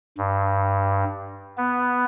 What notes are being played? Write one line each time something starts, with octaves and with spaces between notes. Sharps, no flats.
G2
B3